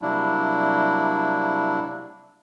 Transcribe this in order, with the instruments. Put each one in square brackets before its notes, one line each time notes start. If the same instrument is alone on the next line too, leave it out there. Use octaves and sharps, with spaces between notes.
[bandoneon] C3 F#3 G3 A#3 D4 E4